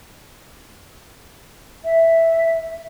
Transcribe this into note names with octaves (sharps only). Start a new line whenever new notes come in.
E5